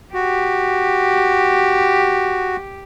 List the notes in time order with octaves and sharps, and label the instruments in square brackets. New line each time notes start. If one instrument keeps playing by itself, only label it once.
[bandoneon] F#4 [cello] G4